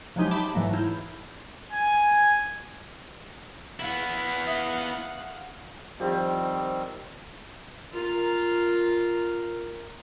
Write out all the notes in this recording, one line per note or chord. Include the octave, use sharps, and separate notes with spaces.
F3 F#3 G#3 D#4 G4
E5 G5 A5 B5 D6
G#2 E3 F#3 A3 A#3
E4 F6 G6
G#5
B3 E4 F5 F#5
E5 D#6
D#3 F3 G3 C4 G4
F4 A#4